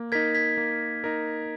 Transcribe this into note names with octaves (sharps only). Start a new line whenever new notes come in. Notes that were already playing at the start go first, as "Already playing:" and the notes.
Already playing: A#3
D#4 A#4 G#6 B6
G#6 B6
A#3
D#4 A#4